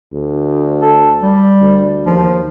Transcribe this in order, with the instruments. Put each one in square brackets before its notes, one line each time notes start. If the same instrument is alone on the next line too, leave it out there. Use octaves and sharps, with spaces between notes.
[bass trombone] D2
[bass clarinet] A4
G3
[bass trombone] D2
[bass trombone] D#2 [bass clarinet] F3